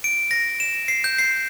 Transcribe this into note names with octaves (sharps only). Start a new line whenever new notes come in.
D7
A#6
E7
C7
G6
C7